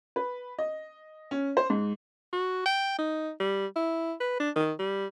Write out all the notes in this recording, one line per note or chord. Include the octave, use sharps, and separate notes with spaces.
B4
D#5
C#4
C5
G#2
F#4
G5
D#4
G3
E4
B4
D4
D#3
G3